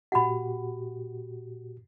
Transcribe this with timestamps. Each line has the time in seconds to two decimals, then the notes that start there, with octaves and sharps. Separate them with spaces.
0.12 A#2 F#4 G4 F#5 B5